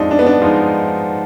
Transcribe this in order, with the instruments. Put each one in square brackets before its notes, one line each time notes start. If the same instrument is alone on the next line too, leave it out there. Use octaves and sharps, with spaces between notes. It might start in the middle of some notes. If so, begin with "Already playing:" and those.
Already playing: [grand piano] F2 F3 G#3 [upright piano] D4 D#4
[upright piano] D4
B3
D4
[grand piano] F3 G#3 D#4